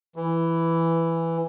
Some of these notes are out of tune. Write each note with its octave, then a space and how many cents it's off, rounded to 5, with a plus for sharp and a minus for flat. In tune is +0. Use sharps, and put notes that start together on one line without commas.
E3 +5